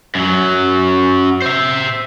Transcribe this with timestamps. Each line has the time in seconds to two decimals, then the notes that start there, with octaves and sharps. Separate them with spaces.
0.15 F#2 F#3
1.42 C5 E5